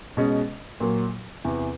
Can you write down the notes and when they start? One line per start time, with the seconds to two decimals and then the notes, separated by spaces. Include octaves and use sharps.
0.17 B2 G#3 C#4
0.80 A#2 F#3 A#3
1.45 E2 C3 E3